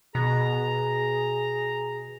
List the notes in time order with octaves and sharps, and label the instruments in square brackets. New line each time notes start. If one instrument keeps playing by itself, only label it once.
[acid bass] B2 [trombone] G#4 [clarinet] A#5